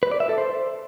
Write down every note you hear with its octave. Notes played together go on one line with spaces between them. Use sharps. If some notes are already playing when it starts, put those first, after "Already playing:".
B4
D5
E5
A4
C5